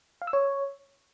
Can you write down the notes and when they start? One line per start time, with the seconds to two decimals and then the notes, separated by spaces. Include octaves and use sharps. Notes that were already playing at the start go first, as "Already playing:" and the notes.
0.22 F5
0.27 E6
0.33 C#5